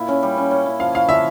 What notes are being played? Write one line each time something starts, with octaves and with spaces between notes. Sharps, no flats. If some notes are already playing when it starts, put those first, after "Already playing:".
Already playing: A#2 E4
C#4
G3
C#4
C#4
E4
F3 F5
E4 F5
F3 E5